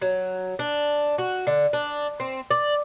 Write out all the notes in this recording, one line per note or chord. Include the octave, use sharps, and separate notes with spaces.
F#3
D4
F#4
D3
D4
C4
D5